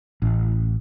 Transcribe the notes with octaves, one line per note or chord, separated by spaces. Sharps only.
A1